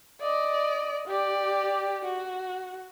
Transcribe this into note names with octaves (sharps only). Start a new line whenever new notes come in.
D5 D#5
G4 D5
F#4